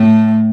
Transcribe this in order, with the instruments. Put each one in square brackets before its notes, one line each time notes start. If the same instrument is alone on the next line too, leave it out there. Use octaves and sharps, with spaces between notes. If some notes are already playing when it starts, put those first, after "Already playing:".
Already playing: [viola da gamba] A2 A3